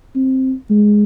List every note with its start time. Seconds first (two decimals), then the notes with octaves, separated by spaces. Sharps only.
0.15 C4
0.70 G#3